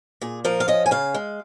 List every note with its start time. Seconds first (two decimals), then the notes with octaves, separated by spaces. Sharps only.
0.21 A#2 G#4
0.45 F3 A#4
0.60 F5
0.68 C#4 D#5
0.86 G#5
0.91 C#3 F5
1.14 G#3